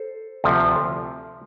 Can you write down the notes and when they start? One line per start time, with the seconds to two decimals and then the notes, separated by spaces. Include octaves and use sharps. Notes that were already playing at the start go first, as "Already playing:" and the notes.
Already playing: A4 C5
0.44 D2 C3 F3